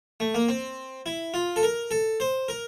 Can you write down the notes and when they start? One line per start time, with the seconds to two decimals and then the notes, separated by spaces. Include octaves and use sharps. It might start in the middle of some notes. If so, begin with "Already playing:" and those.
0.20 A3
0.34 A#3
0.48 C4
1.06 E4
1.34 F4
1.56 A4
1.63 A#4
1.91 A4
2.20 C5
2.48 A#4